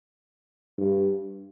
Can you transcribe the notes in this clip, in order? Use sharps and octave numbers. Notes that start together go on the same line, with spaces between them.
G2